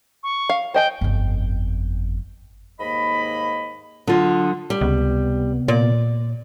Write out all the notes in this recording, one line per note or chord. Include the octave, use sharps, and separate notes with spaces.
C#6
F5
C5 D#5 G5 G#5
G1 F2
D#2 G#2 A#3 D#5 B5
D3 F#3 F4 D#6
G3
C#2 C3 B3
A#2 D5